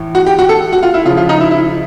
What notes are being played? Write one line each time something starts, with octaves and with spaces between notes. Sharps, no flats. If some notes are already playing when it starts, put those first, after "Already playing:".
Already playing: A2 E3
F#4
G4
F#4
A4
F#4
F4
E4
C#3 F3 F4
F4
D#4
E4
E4